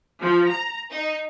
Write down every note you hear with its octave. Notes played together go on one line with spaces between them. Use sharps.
F3
A#5
D#4